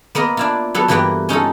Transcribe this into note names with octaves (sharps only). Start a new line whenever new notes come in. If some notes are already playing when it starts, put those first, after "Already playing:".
A#3 B3 A#4 D#5
D4 E4 F4
F#3 B3 A4
G2 E3 A#3 B3 B4 G5
C#4 D#4 F4 A4